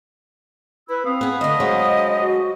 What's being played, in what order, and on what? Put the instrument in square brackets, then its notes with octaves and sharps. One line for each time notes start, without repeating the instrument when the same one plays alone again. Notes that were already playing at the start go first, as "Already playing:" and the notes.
[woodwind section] E4 E6 [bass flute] B4
[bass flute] C4 [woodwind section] F5 B5 D#6
[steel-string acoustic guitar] B3 G#4
[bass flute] D3 [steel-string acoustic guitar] A3 D4 [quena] D#5
[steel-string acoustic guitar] F#3 G#3 D4 [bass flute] C5
[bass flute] F#4